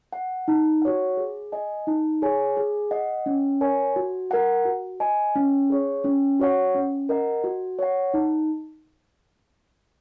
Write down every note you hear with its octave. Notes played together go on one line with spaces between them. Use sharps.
F#5
D#4
F#4 C#5 F#5
G#4
D#5 G#5
D#4
G#4 C#5 G#5
G#4
D#5 F#5
C#4
A#4 C#5 G#5
F#4
A#4 F#5
F#4
D#5 G#5
C#4
G#4 C#5
C#4
F#4 C#5 F#5
C#4
A#4 D#5 F#5
F#4
C#5 F#5
D#4